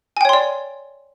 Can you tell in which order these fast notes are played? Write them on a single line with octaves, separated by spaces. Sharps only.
G#5 G5 C#5 C6 D5